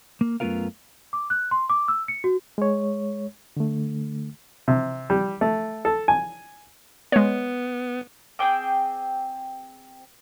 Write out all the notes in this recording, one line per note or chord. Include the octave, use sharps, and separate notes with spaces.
A#3
F#2 A3 B3 F4 A#4 F5
D6
F#6
C6
D6
E6
C#7
F#4
G#3 C#5
D3 A3
C3
G3
A3
A4
G#5
G#3 B3 C#5
C4 G#4 G5 D6